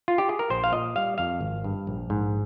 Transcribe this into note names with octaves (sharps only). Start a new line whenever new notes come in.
F4
G4
G#4
A#4
A#1 C5
F5
A#2 D#5
G3 F5
F2 F5
G#1
G2
A#1
G#2